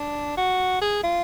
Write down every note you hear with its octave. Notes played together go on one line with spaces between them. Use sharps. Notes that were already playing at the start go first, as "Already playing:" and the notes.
Already playing: D4
F#4
G#4
F4